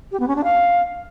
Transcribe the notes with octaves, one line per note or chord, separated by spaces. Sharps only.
G4
B3
C#4
D4
F5